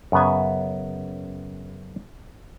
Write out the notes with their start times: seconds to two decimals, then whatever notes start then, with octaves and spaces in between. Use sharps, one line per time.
0.12 F#2 C#3 B3 G#5